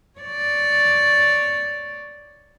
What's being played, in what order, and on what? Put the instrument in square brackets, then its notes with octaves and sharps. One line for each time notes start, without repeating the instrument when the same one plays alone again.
[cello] C#5 D5